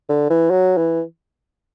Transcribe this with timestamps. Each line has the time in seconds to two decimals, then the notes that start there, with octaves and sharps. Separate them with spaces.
0.09 D3
0.30 E3
0.50 F#3
0.77 E3